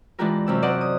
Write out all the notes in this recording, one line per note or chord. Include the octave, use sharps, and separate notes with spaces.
E3 G#3 D4 F4 G4 A#4
F#2 C3 E6
C5 D5 D#5 F#5
D#6